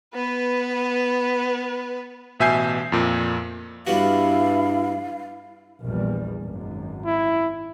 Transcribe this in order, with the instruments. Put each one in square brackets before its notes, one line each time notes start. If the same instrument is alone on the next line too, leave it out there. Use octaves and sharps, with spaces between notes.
[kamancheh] B3 B4
[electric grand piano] A1 B2 E5 G#5 G6 C7
F2 A#2
[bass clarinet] G2 [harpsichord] G3 B3 F#4 [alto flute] E4 [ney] F5
[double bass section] A#1 E2 G3
G#1 F#2
[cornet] E4